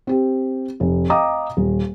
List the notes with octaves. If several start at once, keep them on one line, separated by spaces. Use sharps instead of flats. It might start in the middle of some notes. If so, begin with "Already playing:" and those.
C4 G4
F1
D#5 F5 G5 A#5 D6 D#6
D#1